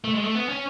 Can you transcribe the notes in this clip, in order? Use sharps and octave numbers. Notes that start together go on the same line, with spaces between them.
A3
G#3
A3
B3
C#4